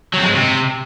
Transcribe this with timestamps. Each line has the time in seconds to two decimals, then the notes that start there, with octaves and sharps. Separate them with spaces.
0.14 F#3
0.19 C4
0.24 G#3
0.29 G#2
0.34 C3